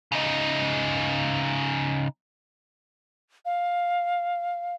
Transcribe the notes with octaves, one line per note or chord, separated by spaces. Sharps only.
C#3 D#4
F5